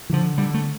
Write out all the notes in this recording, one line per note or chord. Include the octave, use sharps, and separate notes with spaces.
E3
D3 F3
D3 G3
A3